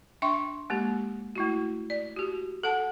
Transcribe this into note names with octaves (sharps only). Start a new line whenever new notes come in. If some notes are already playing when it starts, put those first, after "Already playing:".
D4 E5 G5 C6 C#6
G#3 A#3 G4
A3 E4 F#4
D5
F#4 G4
A4 F#5 A5